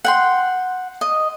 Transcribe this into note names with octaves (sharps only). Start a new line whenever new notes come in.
F#5 G5 C6
D#5